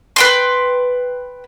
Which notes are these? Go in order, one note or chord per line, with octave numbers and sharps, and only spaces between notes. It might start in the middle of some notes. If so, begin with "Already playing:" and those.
B4 G5 C6